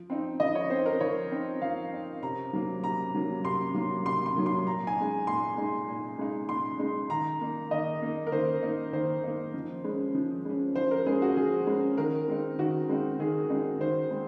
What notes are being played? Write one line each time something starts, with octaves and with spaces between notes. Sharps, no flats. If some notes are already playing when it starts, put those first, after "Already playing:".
Already playing: F3
C4 D#4
F3 D#5
C#5
C4 D#4 C5
A#4
F3 C#5
C4 D#4
F3 F5
C4 D#4
C3 A#5
F#3 A#3
C3 A#5
F#3 A#3
C3 C6
F#3 A#3
C3 C6
C6
F#3 A#3
C6
A#2 A#5
G#5
G#3 D#4
A#2 C6
G#3 D#4
A#2
G#3 D#4
A#2 C6
G#3 D#4
D#3 A#5
A#3 D#4
D#3 D#5
A#3 D#4
A#4
D#3 C5
A#3 D#4
D#3 C5
A#3 D#4
F3
G#3 C#4
F3
G#3 C#4
F3 C5
A#4
G#3 C#4 G#4
F#4
F3 G#4
G#3 C#4
D#3 A#4
G#3 C4 D#4
D#3 F#4
G#3 C4 D#4
D#3 G#4
G#3 C4 D#4
D#3 C5
G#3 C4